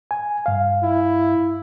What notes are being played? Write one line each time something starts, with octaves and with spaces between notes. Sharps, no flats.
G#5
G2 F5
E4